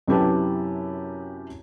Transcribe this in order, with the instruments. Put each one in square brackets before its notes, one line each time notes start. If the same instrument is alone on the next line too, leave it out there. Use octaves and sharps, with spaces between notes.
[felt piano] F#2 C3 E4 G4 B4 A5